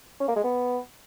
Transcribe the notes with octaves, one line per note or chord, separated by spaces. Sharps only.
C#4
A#3
G#3
B3